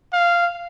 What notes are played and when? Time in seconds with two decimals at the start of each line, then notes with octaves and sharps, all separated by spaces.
0.13 F5